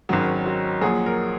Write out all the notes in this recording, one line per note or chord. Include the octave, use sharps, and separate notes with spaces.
G#1 G#2 D#3 F#3 C#4
F#4
A#1 A#2 F#3 G#4
A#4